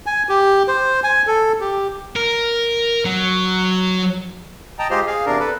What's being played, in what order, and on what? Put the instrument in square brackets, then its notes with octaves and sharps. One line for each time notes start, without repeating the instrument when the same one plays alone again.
[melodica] G#5
G4
C5
G#5
A4
G4
[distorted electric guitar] A#4
F#3
[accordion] D#5 G5 A5 A#5
G#3 F4 G4 C5 D#5 C6
G#4 F5
E2 C3 D4 A#4
A4 B4